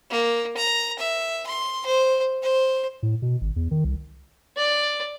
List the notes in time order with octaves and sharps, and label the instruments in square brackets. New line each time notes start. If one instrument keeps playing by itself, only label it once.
[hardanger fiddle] A#3
A#5
E5
C6
C5
C5
[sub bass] A2
B2
G#1
E2
D#3
C2
[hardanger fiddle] D5